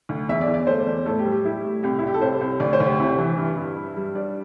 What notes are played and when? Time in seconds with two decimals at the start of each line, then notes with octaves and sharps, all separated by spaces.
0.09 D2
0.29 E2 E5
0.41 D5
0.48 E2
0.54 D5
0.67 A3 C5
0.86 E2
1.05 A2 A4
1.19 G4
1.25 G3
1.32 G4
1.44 G3 E4
1.64 A2
1.83 C2 G4
1.99 E4
2.03 C2 G4
2.14 A4
2.21 C2 C5
2.41 C2
2.60 D2 D5
2.73 C5
2.80 D2
2.87 G4
3.00 C3 E4
3.18 E3
3.37 G2
3.57 G2
3.76 G2
3.96 G3
4.15 G2 D5